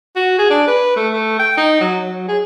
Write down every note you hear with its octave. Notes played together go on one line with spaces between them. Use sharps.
F#4
G#4
D4
B4
A3
A3
G5
D#4
F#3
F#3
G#4